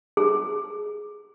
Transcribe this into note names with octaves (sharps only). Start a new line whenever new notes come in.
G#4